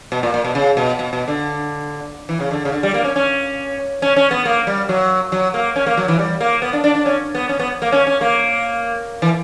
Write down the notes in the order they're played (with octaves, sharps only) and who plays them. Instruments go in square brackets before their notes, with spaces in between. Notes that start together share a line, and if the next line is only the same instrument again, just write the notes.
[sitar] B2
A#2
A#2
B2
C#3
B2
B2
B2
D3
E3
C#3
D3
C#3
D3
G3
A#3
C#4
C#4
C#4
C#4
B3
A#3
G3
F#3
F#3
A#3
C#4
A#3
F#3
E3
G3
A#3
B3
D4
D4
D4
C#4
B3
C#4
B3
A#3
C#4
C#4
A#3
E3